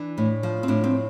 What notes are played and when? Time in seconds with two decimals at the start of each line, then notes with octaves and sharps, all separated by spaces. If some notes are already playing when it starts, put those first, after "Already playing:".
Already playing: E3 D4
0.18 A2
0.43 F3
0.63 C4
0.68 A2 D4
0.84 C4